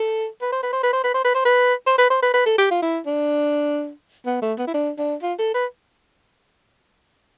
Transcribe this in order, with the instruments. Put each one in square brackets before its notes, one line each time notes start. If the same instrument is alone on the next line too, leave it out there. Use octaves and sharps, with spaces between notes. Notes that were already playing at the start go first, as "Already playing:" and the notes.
Already playing: [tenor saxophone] A4
B4
C5
B4
C5
B4
C5
B4
C5
B4
C5
B4
C5
B4
C5
B4
B4
A4
G4
F4
E4
D4
B3
A3
B3
E4
D4
D4
F4
A4
B4